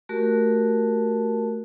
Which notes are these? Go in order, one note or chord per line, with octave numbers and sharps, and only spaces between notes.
A3 F#4 G4 A#4 A5